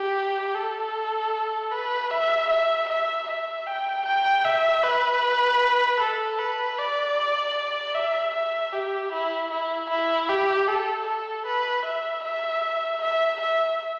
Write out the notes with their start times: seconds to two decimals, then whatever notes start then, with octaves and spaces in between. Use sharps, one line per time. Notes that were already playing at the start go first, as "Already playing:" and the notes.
Already playing: G4
0.55 A4
1.71 B4
2.11 E5
2.50 E5
2.89 E5
3.28 E5
3.67 G5
4.06 G5
4.45 E5
4.84 B4
6.00 A4
6.39 B4
6.78 D5
7.95 E5
8.34 E5
8.73 G4
9.12 E4
9.51 E4
9.90 E4
10.29 G4
10.68 A4
11.07 A4
11.46 B4
11.85 E5
12.24 E5
13.02 E5
13.41 E5